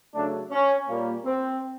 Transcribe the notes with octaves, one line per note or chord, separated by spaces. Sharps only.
C#3 F#3 A3 D4
C#4
A#2 G3 A#3
C4